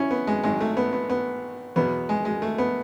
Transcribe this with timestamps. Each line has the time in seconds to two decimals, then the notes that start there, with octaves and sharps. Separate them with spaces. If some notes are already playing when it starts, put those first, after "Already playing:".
Already playing: C#4 E4
0.11 B3
0.27 G#3
0.44 G#1 G#2 F#3 G#3
0.61 A3
0.77 B3
0.93 B3
1.10 B3
1.76 E2 B2 F#3 B3
2.09 G#3
2.25 G#3
2.42 A3
2.58 B3